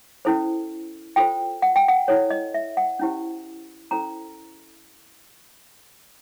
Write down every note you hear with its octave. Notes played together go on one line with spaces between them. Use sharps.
C#4 E4 A4 C5
F4 A4 C5 G5
F#5
G5
F#5
E4 A4 C#5
D#5
E5
F#5
C#4 E4 G4 C5
C#4 E4 A4 C5 A#5